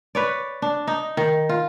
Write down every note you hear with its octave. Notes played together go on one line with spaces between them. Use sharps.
B4 C#5 D5
D4
D#4
D#3
F4